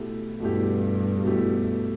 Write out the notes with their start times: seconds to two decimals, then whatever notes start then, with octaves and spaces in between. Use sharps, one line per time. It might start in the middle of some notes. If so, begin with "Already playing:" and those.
Already playing: B2 A3 E4 G4
0.40 G2 B2 A3 E4 G4
1.23 B2 A3 E4 G4